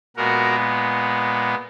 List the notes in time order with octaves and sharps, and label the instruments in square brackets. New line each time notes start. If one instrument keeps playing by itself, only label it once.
[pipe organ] A#2 G#3 B3 F#4 A#4